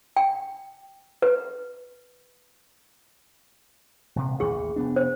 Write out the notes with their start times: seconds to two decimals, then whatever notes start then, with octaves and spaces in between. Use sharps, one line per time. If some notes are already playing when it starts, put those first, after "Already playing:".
0.16 G5
1.22 B4
4.16 D#1 C3
4.40 A1 D#2 G#4 C#6
4.76 F1 B3 D4
4.96 C5